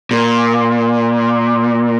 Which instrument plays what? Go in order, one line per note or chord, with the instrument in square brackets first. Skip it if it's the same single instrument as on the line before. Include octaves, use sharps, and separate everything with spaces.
[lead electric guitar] A#2